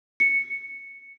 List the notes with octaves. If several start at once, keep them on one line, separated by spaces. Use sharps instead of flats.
C#7